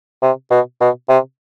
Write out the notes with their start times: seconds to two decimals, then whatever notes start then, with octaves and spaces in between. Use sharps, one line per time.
0.22 C3
0.51 B2
0.81 B2
1.09 C3